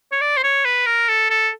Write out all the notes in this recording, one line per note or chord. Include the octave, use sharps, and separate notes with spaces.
C#5
D5
C5
C#5
B4
A#4
A4
A4